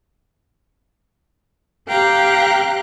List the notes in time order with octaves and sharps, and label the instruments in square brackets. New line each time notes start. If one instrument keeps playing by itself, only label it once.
[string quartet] G4 F5 G5 A#5 F#6